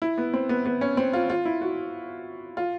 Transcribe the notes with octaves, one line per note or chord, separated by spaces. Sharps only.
E4
B3
C4
B3
B3
C#4
C4
F4
F4
E4
F#4
F4